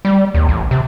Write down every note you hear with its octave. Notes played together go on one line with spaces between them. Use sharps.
G3
D#2
A1
C3